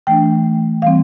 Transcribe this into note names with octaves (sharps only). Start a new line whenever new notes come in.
E3 A3 D4 G5
E3 G3 C4 F5